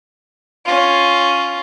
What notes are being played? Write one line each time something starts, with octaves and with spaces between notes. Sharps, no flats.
C#4 F4